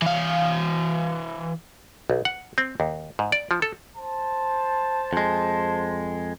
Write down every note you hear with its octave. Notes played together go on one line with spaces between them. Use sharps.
E3 F5
B1
F#5
C4
D#2
G#2
D5
F3
A4
C5 A5
F2 G#3